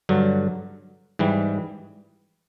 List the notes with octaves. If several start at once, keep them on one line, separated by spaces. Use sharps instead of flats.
G2 D3 F#3
G#2 E3 G3